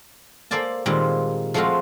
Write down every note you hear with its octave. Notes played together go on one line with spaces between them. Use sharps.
A#3 A4 C5 D5 G#5 A5
A#2 D#3 G3 G#3 A#3 C4
F3 G#3 A3 C4 F#4 F5